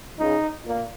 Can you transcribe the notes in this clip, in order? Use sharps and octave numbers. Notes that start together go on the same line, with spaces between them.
C#2 C#3 G#3 D#4
A#2 A#3